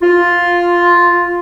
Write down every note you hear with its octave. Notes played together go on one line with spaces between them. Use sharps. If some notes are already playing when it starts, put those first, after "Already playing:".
F4